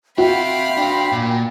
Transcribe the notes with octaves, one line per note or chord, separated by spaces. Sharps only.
C4 F#4 E5 F5 G5 B5
D4 C5
A#2